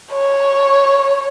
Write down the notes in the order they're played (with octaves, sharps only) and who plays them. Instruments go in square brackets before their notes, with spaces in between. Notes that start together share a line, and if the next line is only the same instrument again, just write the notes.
[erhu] C#5